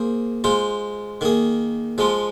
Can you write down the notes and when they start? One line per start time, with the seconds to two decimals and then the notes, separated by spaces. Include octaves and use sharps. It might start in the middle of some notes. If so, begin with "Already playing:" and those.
Already playing: A#3 G#4 C5
0.44 G#3 F4 C5
1.21 D#3 A#3 G#4
1.98 F3 G#3 F4